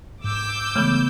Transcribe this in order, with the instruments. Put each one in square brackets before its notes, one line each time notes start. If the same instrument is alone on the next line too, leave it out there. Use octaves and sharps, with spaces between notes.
[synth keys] G#2 [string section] D6 E6 G6
[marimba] C#3 E3 B3 [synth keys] G#3 A3